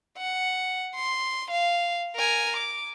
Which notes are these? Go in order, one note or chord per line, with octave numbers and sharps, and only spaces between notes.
F#5
C6
F5
A#4 G#5
D6